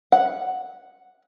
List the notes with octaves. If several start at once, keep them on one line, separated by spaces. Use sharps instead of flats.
F#5